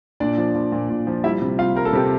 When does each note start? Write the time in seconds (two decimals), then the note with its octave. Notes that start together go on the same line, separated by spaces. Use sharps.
0.20 A#2 D4 D5
0.38 F3
0.55 F3
0.72 A#2
0.90 A#2
1.07 F3
1.24 G3 E4 E5
1.42 C3
1.59 G3 F4 F5
1.75 G3 A#4
1.85 A4
1.93 C3 G4